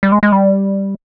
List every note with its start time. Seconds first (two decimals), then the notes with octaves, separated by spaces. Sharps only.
0.03 G3
0.12 G#3
0.23 G#3
0.32 G3